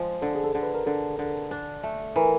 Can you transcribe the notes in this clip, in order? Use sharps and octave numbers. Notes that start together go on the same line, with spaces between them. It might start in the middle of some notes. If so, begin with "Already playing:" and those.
Already playing: F3 G#3
D3 A4
G#4
A4
D3
B4
A#4
D3 A4
D3
D4
A3
E3 A#4